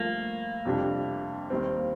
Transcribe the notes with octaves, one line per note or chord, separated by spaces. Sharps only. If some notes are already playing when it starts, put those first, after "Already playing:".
Already playing: G2 F3 A3 A#3
F2 C3 G3 D4 G4
D#2 D#3 G3 C4